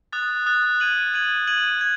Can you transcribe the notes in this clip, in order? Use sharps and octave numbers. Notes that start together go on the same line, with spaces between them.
D#6 F#6 A6
D#6 F#6 A6
G#6 D#7 F#7
G#6 D#7 F#7
G#6 D#7 F#7
G#6